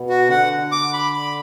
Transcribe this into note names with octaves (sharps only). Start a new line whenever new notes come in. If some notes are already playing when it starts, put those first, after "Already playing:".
Already playing: B2
F#4
D3 F#5
D6
B5
B5